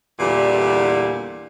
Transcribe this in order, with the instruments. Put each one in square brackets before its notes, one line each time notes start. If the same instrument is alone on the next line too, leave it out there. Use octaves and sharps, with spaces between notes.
[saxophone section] E2 A#2 D3 E3 G3